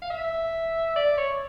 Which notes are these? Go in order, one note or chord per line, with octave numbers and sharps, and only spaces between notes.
F5
E5
D5
C#5